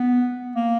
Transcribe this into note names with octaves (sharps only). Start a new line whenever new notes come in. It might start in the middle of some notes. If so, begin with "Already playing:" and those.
Already playing: B3
A#3